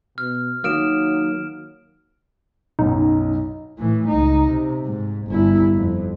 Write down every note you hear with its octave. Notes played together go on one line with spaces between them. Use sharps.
B2 F6
D#3 F#3 A#3 D#4 F6 D7 E7
B1 F#2 D#4
A2 E3
C#2 D#4
C3
G#2
G1 E4
F2